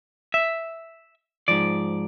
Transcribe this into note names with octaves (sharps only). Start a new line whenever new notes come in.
E5
G#2 F3 D5